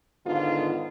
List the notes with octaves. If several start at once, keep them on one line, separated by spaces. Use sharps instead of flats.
G#2 D3 D#3 B3 F4